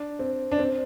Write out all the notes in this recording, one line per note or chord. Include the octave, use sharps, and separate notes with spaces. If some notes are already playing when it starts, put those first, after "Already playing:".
Already playing: D4
C4
D4
C4